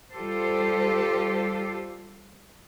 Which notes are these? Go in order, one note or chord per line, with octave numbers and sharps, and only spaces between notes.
G3 F4 G4 A4 C5